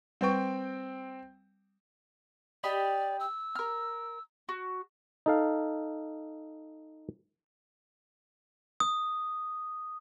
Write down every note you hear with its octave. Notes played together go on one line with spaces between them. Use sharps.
G3 C4 B4 G5 C#6
G4 D5 D#5 B5
E6
A#4 F6
F#4
D#4 A4 F5
D#6